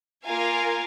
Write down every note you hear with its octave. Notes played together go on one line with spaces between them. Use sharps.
A#3 F4 A#4 F5 G#5